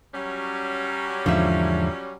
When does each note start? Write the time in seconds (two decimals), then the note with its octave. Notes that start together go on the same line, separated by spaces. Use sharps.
0.14 F#3 G3 C#4
1.26 E2 G#2 D3 F3 E5